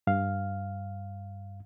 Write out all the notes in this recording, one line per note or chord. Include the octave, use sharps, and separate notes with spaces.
G2 F5